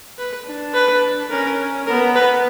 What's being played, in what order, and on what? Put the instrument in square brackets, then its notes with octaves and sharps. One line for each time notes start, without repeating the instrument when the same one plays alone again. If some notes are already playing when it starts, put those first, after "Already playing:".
[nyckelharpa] B4
[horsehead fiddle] D4
[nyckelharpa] B4
[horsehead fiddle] C#4 [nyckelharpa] A#4
[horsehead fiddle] B3 [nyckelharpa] A#4
[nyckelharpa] B4